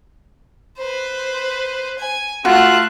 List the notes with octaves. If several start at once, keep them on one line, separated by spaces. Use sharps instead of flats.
B4 C5
G#5
A3 F4 F#4 F#6